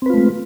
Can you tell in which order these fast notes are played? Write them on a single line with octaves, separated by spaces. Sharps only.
C4 B4 F4 A3 G#3